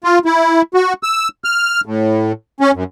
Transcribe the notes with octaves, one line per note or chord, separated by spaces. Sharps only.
F4
E4
F#4
E6
F6
A2
C#4
F#2